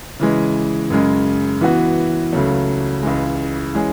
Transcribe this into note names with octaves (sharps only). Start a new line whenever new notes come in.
C#3 E3 G#3
F#2 C#3 G#3
E3 B3 F#4
C#2 C#3 F#3 A3
C#2 C#3 E3 G#3
E3 G#3 C#4 G#4